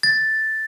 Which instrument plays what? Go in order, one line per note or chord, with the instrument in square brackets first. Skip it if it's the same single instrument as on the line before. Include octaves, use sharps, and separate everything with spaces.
[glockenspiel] A6